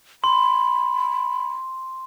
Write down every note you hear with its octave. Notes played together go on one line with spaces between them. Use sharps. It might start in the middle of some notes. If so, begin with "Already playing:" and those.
B5 C6